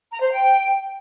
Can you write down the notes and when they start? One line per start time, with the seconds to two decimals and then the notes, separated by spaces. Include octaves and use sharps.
0.11 A#5
0.21 C5
0.31 G5